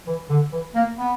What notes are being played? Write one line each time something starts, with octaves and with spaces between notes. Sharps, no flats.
E3
D3
E3
A#3
B3